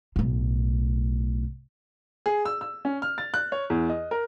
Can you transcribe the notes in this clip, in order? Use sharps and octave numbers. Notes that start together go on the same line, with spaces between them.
B1 A2
G#4
E6
E6
C#4
F6
A6
F#6
C#5
E2
D#5
A#4